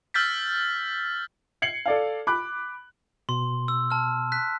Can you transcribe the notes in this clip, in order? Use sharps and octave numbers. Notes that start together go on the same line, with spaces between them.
E6 F6 G6 A6 B6
G#6 C7 C#7 F#7
A4 D5 F5
B5 D6 F#6
B2 C6
E6
A5 F6
F#6 B6